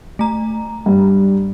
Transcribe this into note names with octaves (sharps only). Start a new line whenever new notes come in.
A3 A#5
G2